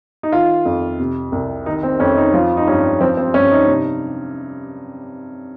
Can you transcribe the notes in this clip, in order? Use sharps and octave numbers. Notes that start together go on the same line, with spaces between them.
D#4
D#3 F4
F2
C3
C2
D#3 D#4
C4
F2 C#4
D#4
F3 F4
D#4
G2 C#4
F3 C4
C4
G2 C#4
D#4
C3